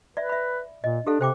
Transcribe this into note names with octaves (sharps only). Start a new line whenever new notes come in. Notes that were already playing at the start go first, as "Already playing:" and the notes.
B4 D5 E5
E5 B5
A#2 D#5
D4 G4 A4 F5
C3 C5 G5 D6